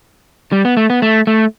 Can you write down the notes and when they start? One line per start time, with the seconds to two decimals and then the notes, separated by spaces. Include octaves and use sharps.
0.52 G3
0.65 B3
0.77 A3
0.90 B3
1.02 A3
1.27 A3